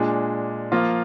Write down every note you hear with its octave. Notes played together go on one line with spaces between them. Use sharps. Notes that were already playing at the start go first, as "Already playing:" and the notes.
Already playing: A#2 G#3 D4
F3 A#3 F4